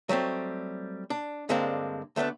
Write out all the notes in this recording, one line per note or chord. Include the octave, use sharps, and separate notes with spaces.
F#3 G3 A3 C4
D4
G2 D3 G#3 A#3 C4 D4
D2 A3 B3 C4 D4